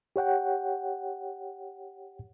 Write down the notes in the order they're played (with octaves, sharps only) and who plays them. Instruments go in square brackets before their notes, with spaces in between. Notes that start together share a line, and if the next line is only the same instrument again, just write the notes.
[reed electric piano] G4 C#5 F#5 G5